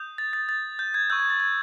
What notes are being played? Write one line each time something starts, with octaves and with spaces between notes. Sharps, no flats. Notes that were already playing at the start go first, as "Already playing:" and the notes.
Already playing: D#6 G6
A6
A6
A6
G6
G#6
C#6 E6 G6
G#6
A6
G#6